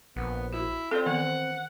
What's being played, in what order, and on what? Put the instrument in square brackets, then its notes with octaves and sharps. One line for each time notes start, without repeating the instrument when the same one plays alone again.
[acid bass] A#1 [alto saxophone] B3
[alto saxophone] E4 [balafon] F#4
[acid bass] C4 [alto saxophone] F4 [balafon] A4 D5
[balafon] D#3 E3 B3 [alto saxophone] F#5